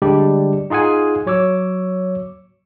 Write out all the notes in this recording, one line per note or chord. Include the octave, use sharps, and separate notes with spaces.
D3 G3 G#3 D4 G4
D#4 F4 G#4 F#5 G#5
F#3 C#5 D6 E6